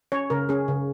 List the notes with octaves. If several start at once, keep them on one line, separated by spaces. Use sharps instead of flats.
C#4 C#5
C#3 A#4
C#4 G#4
C#3